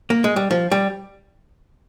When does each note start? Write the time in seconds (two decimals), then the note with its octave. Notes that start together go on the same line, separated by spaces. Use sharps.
0.10 A#3
0.24 G#3
0.36 G3
0.51 F3
0.71 G3